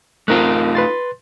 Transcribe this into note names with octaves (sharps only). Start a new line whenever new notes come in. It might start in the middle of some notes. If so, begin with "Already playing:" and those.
A3 C4 D#4 F4 A#4 F#6
B4 C6 A6